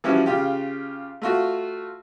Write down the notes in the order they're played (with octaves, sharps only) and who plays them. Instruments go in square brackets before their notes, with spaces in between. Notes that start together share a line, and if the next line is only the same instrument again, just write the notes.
[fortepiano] E3 F3 G3 C#4 F4 F#4
C#3 F4 G4
A3 F4 F#4